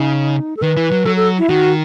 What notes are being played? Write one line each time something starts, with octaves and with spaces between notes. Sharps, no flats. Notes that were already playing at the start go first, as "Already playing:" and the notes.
Already playing: C#3 D#4
A4
D#3 B4
E3
F#3
F#3 A4
A4
E4
D#3 F#4